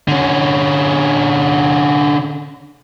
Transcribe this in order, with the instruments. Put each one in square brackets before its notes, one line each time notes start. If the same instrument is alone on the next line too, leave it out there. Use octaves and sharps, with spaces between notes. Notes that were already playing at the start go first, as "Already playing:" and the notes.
[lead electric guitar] D3 C#4